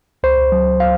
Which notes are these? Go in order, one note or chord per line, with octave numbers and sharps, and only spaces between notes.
C#2 C5
F#3
F5